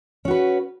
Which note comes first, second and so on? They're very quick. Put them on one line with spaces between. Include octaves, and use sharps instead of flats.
C#4 F#4 B4